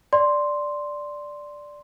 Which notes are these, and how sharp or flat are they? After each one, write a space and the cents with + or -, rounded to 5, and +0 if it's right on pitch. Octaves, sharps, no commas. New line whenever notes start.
D5 +0 C6 +0